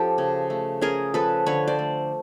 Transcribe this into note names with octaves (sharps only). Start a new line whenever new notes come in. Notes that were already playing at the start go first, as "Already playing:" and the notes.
Already playing: F3 C#4 G4 A4
C#3
A3
C#4 G#4 A#4
F3 A4 B4
D3 B4 C#5
C5 D5
A3